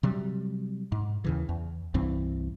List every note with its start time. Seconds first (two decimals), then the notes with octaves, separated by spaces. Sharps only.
0.03 C3 F#3 G3
0.92 G#2
1.24 D#2 C#3 E3
1.49 E2
1.94 C2 G2 E3 C4